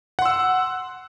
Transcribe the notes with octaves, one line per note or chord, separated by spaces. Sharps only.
F#5 C6 E6